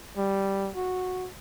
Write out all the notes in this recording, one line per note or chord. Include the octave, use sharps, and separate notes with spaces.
G3
F#4